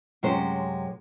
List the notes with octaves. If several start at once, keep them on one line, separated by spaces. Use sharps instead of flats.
F#2 C3 G#3 C#4 C5